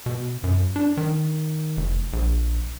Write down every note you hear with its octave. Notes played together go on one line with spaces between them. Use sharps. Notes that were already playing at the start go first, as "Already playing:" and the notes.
B2
F#2
D4
D#3
F1
A#1